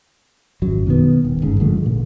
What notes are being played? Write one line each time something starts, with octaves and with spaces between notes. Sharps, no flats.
G#1 F#2 F#3
B2 D#3 E3 B3
D#1
G1 G#2 C#3
D3 F3 G#3 A3
A1 A#2